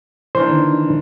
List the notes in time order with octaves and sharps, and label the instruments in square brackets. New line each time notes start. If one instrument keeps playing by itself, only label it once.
[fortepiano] E3 A#3 D4 [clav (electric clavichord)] C5
[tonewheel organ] D3 D#3